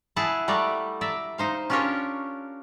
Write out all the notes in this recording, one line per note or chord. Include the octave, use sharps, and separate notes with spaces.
E4 G#4 F#5 A5
G3 A3 D5 F#5 A#5
D5 E5 A#5
D#4 C5 F5
C#4 D4 F4 G4 A#4 C#5